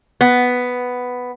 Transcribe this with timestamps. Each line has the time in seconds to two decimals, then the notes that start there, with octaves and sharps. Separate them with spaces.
0.21 B3